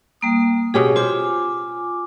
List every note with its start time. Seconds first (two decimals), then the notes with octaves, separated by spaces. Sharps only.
0.21 G3 A#3 D#6
0.74 B2 C#4 G4 G#4
0.96 F4 C5 G#5 D6